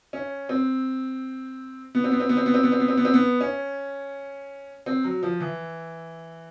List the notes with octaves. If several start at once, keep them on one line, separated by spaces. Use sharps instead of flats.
C#4
C4
B3
C4
B3
C4
B3
C4
B3
C4
B3
C4
B3
C4
B3
C4
B3
C#4
C4
F#3
F3
E3